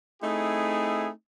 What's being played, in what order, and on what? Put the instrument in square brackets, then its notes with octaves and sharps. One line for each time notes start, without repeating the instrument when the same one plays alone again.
[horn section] A3 C4 D#4 E4 G#4